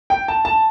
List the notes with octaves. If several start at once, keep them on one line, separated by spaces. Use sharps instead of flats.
G5
A5
A5